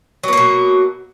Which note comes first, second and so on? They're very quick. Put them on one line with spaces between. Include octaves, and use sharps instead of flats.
F#3 B3 A#3 B2